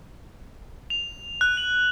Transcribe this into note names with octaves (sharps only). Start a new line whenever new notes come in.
F7
F#6
F#7